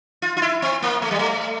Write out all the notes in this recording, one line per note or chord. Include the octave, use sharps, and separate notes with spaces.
F4
F4
E4
C4
A#3
A3
G3
A3